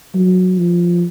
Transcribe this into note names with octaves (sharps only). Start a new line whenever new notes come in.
F#3
F3